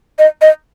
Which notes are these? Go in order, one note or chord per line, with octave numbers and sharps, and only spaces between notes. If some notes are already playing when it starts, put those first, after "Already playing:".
D#5
D#5